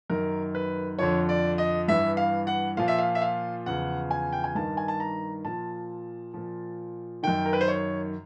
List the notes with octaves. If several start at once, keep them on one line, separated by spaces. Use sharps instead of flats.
F#2 D#3 A#4
B4
F2 D3 F3 C#5
D5
D#5
G2 E3 E5
F5
F#5
A#2 F3 F5
E5
F5
E5
F5
E2 C#3 F3 F#5
G#5
G5
G#5
G2 D#3 A5
G#5
A5
A#5
A#2 F3 A5
A#2 F3
F#2 D#3 G5
A#4
B4
C5
C#5